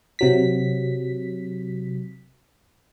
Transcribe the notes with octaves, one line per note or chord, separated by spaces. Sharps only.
C3 F#3 B6